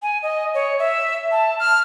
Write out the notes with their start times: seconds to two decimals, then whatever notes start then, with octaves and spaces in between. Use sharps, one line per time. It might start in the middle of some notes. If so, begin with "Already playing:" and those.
0.02 G#5
0.23 D#5
0.54 C#5
0.79 E5
1.32 A5
1.60 F6